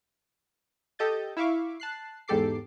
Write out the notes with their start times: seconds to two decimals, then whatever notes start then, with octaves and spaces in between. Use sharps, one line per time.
0.99 G4 A4 D#5 G6 A6
1.37 E4 E5 F5 C#6 D6
1.80 A5 F#6 C7
2.28 E2 G#2 G4 A4 D6 C7